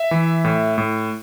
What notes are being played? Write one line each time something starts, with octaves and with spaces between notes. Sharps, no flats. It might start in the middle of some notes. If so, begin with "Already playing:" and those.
Already playing: E5
E3
A2
A2